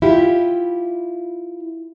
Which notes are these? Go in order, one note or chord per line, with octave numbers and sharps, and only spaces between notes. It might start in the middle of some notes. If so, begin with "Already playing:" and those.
E4 F4 G4